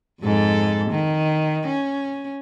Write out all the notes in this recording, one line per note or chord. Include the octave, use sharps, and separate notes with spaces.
F2 G#2 A4
D#3
C#4